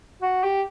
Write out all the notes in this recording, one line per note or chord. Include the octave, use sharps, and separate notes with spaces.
F#4
G4